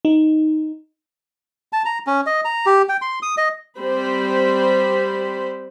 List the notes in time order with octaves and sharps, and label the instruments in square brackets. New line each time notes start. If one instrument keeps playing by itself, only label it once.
[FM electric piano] D#4
[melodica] A5
A#5
C#4
D#5
A#5
G4
G5
C6
D#6
D#5
[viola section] G3 C4 C5 B5